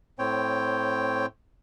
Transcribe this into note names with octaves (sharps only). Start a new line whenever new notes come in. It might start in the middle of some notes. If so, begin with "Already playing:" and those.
A2 C4 C#5 G5